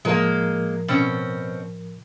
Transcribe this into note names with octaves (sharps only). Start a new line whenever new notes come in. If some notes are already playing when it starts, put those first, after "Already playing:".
A2 F3 G#3 A#3 A#4
B2 C4 C#4